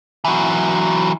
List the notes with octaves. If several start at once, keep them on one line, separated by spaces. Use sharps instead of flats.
E3 F#3